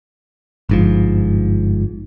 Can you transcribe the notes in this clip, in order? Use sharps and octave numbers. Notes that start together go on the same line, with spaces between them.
G1 G#2 F3